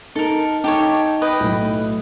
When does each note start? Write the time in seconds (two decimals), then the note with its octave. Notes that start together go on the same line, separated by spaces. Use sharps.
0.15 D#4 A4 A#4
0.64 D#4 G4 A4 C#5
1.22 B4 D#5 G5
1.40 B1 A2